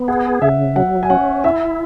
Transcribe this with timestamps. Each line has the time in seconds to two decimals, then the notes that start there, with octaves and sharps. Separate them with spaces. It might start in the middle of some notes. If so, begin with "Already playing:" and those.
Already playing: B3
0.08 G#4 F#5
0.42 C#3 E5
0.76 F#3 F#5
1.03 G#5
1.10 C#4 F#5
1.44 E4 E5